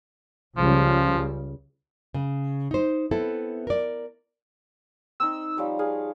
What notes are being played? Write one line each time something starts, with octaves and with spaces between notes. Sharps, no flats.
C#2 C#3 F3 G3
C#3
D#4 C5
B3 C4 E4 A4
A#4 D5
C4 D#4 E6
F3 G3 C#5
G#4 F5